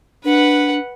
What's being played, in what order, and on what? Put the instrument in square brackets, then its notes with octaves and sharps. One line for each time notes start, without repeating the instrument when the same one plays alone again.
[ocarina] D4 [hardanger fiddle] B4 F#5